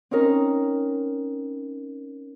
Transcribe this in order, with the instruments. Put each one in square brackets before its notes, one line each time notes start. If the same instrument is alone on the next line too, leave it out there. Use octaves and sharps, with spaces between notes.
[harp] C4 C#4 D#4 A#4